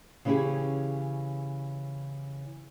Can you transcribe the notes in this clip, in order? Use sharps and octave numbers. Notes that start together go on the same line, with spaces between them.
C#3 E3 C#4 E4 G4 G#4